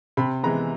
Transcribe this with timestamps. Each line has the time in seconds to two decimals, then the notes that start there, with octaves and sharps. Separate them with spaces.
0.17 C3 B5
0.43 E3 G#3 B3 A#5